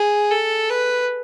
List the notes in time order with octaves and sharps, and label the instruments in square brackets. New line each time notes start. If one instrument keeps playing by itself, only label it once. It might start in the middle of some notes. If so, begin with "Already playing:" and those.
Already playing: [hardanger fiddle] G#4
A4
B4